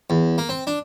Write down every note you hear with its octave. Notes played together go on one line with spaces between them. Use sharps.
E2
A#3
C4
D4